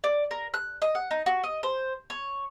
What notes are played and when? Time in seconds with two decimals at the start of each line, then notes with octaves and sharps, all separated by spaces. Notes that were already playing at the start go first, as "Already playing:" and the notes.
0.04 D5
0.31 A#4
0.54 F#6
0.82 D#5
0.95 F#5
1.11 D#4
1.26 F#4
1.44 D#5
1.63 C5
2.10 C#5